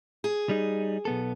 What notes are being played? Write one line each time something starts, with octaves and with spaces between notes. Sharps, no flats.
G#4
G3 D#4
B1 B3 A4